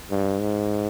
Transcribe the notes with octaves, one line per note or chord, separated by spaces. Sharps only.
G2
G#2